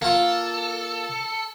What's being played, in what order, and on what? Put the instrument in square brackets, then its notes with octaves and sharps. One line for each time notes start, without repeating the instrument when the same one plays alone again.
[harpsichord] A#3 F4 [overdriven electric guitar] A4